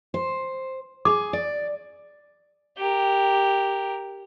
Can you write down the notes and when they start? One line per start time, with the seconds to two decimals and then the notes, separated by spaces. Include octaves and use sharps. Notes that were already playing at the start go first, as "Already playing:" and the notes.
0.14 C5
1.05 G#4 D6
1.33 D5
2.78 G4 A#4